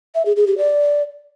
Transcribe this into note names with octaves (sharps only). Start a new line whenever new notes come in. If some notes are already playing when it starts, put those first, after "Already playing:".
E5
G#4
G#4
G4
D5